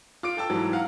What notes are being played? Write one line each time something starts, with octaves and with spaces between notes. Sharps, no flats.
F4 D6 D7
A4 G5 A5 E6
G#2 E3 F#3
F5 F#5 A#5